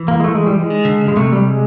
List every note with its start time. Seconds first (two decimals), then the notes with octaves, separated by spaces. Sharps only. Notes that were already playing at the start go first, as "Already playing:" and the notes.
Already playing: E3
0.08 A#3
0.20 G#3
0.24 A3
0.35 G#3
0.47 G3
0.59 G#3
0.70 D#3
0.85 D3
1.01 C#3
1.08 G#3
1.16 C3 A3
1.32 G3
1.47 G#3